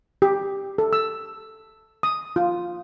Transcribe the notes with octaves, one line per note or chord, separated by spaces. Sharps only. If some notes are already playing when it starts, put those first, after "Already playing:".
G4
A4
E6
D#6
F4